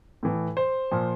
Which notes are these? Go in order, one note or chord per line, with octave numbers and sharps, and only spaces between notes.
A2 E3
C5
A#2 F3